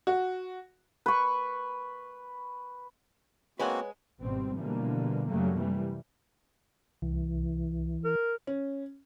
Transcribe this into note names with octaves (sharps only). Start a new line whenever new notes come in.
F#4
B4 C#6
G#3 A#3 C4 F#4 B4 C#5 F#5 G#5
G#1 B2 G3 C4
B2 D3 E3 F3 G3 A#3
F#2 C#3 F#3 G3 A3 A#3
C3 E3 G3
C2 E3
A#4
C#4